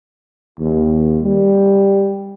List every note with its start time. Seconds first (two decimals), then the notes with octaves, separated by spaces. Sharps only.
0.59 D#2
1.23 G3